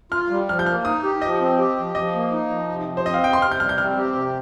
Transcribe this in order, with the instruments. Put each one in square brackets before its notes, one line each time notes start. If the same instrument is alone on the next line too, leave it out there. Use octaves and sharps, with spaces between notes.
[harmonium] F4 [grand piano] F6
[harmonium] G3
[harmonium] F3 [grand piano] F6
[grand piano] G6
[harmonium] A#3 [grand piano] F6
[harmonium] D#4 [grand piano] D#6
[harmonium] G4
[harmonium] F3 [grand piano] D#5
[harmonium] C4
G4
F3
[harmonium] F3 [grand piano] D#5
[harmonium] A#3
D#4
F3
C3
F3
[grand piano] C5
[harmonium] C4 [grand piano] D#5
[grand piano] F5
[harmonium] C3 [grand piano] G5
[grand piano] C6
[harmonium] C3 [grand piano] F6
[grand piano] G6
[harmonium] G3 [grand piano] F6
[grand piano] G6
[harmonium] C4 [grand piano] F6
[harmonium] G4
C3